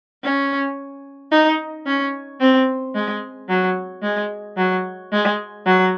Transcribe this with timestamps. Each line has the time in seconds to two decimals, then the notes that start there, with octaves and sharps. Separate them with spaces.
0.24 C#4
1.32 D#4
1.86 C#4
2.41 C4
2.95 G#3
3.49 F#3
4.03 G#3
4.57 F#3
5.12 G#3
5.66 F#3